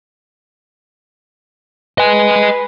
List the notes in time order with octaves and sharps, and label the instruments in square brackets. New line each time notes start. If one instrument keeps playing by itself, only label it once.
[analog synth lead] B4 [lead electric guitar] D#5 G#5